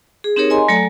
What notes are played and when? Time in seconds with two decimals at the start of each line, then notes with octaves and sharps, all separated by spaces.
0.24 G#4
0.36 C4 D#4 G4 G#4 A#4 C#5
0.50 D#5 G#5 A#5 C6
0.68 F#3 A3 A4 D5 G#5 A#5